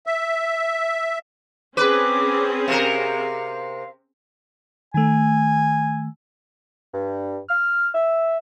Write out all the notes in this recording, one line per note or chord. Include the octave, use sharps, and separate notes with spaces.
E5
C4 C#4 G#4 B4 D6
C3 A#4 F5
D#3 A3 G#5
G2
F6
E5